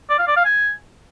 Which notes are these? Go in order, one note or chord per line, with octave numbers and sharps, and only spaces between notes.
D5
F5
D5
F5
G#5